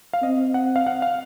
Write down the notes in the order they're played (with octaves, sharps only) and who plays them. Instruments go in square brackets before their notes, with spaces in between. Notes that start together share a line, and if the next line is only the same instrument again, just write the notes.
[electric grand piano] F5
[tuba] C4 [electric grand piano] D#5
[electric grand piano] F#5
F5
F#5
F5